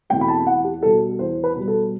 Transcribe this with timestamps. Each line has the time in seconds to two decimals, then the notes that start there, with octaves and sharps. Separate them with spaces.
0.10 E2 B2 A3 C4 G5
0.21 B5
0.28 A5
0.46 E2 F#5
0.64 G4
0.83 B2 G3 A4
1.19 E2 C5
1.44 B4
1.56 B2 G3
1.68 A4